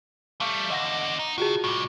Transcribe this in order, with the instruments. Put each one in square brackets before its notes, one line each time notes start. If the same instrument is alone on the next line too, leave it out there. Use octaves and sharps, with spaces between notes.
[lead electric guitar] G3 A3 [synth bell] F5 C#6 D6
[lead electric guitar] E2 D3 [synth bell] D#5 F#5 A#6
[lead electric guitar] D#4
[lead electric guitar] C#3 [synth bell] F4 F#4 G#4
[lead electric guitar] C2 A2 [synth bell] C#6 D6